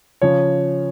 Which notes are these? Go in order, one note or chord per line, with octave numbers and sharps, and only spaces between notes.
C#3 F3 C#5